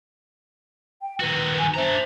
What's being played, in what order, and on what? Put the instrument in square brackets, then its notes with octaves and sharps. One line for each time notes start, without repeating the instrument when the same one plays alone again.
[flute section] G5
[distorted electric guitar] D#3 F#4 [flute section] B4
[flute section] G#5
[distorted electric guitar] D4 A#5 [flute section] C5 E5